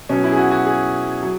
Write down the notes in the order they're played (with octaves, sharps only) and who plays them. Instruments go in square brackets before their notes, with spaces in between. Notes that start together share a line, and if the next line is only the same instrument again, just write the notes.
[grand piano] B2 F#3 C#4
E4
G#4
F#4
F#4
G#4
F#3